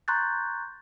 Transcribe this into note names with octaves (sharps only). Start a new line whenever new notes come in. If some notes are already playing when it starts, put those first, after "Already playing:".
A#5 C6 C#6 F#6 G6 A6